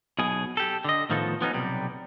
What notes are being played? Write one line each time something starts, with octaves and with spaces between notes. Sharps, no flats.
B1 B2 G#4
G4 A4
D3 D#5
A2 D#3 F3 B3 A4
F3 B3 C#4 D#4
B1 C3 G3